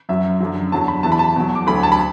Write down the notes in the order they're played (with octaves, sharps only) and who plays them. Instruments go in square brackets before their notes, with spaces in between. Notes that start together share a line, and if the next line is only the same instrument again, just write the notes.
[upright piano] F#2 F#3 E5
F#2 D3 F#3
E2 D3 F#3 A5
B5
E2 E3 A5
B5
A5
E2 B2 F#3
D6
D2 D3 F#3 B5
A5
B5